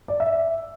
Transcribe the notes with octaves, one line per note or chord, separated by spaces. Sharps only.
D5
E5